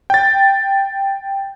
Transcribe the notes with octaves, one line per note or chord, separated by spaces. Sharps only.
G5 A6